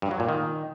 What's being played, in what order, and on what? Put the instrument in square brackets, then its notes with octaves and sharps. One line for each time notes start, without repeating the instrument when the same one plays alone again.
[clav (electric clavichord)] G2
F#3
A#2
D#3